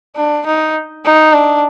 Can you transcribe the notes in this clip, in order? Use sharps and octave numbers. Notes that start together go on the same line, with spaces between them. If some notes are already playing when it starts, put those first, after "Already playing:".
D4
D#4
D#4
D4